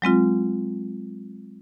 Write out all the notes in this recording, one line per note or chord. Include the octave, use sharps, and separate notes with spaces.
F#3 G#3 C4 F4